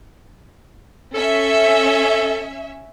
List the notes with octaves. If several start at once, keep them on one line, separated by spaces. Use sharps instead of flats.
C#4 A4 E5